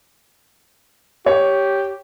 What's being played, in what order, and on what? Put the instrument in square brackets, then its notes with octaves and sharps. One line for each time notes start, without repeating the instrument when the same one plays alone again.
[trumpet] G4 [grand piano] C#5